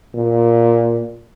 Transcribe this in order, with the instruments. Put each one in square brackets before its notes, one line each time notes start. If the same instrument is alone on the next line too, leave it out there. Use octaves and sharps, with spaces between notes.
[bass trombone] A#2